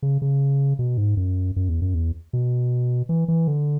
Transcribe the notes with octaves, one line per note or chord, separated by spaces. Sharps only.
C#3
C#3
B2
G#2
F#2
F#2
E2
F#2
E2
B2
E3
E3
D3